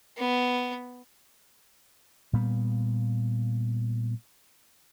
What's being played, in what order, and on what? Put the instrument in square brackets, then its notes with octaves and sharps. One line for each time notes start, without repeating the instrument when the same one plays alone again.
[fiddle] B3
[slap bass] A#2 G3 B3